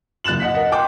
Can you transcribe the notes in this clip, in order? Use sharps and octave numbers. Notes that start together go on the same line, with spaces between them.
F#1 F#6 A6 E7 F#7
D#5 F#5 B6
A#4 D#5 F#5
G5 C6 D6